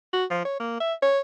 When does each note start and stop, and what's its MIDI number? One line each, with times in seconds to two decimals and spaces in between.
0.13 0.25 66
0.30 0.44 53
0.45 0.55 73
0.60 0.76 58
0.80 0.93 76
1.02 1.20 73